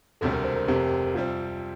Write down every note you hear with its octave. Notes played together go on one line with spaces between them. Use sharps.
E1 D2 C3 G3 A4
A#4
C5
A#4
F1 F2 C3 G4
F2 C3 G3 C4 F4